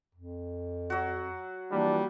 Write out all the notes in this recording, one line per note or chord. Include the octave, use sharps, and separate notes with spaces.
F2
F#3 F#4
E3 F3 G3 A#3 D4